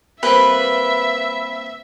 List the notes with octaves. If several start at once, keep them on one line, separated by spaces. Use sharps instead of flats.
G3 A#3 C4 B4 E5